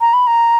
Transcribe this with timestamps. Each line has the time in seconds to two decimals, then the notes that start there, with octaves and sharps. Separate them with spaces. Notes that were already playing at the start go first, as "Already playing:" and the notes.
0.01 A#5
0.13 B5
0.27 A#5